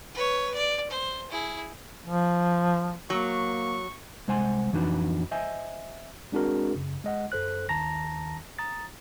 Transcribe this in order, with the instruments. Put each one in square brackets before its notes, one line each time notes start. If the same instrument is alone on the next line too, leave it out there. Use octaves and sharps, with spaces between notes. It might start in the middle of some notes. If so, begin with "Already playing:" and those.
[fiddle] B4 C#5
D5
C5
E4 G#4
[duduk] F3
[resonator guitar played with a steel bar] F#3 [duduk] A#3 [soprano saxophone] C#6
[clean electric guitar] C2 G#3 C5 F#5 G#5 C6
F2 E3 D4 D#4 F#4 B4
C5 D#5 E5 G#5
[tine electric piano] G#3 C4 D4 F#4 G#4 A#4
F#2 C#3
G#3 D#5 F#5
F#2 A4 C5 F#6
D#2 D#3 A5 A#5 A#6
A#5 D#6 A6